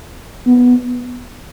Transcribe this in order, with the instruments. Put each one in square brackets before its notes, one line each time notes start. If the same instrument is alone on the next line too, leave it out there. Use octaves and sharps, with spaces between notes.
[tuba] B3